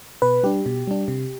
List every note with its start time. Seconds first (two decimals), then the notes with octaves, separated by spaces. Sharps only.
0.22 B2 B4
0.43 G3 D4 G4
0.66 B2
0.87 G3 D4
1.08 C3